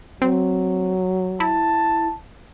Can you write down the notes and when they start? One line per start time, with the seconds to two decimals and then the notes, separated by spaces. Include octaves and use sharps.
0.22 F#3 C4
1.40 E4 A5